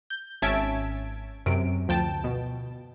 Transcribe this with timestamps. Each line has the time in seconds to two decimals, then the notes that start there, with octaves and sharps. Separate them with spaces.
0.10 G6
0.42 G#1 C#4 E5 A5 G#6 D7
1.46 F#2 C3 D7
1.88 D2 F3 G5 A5
2.24 B2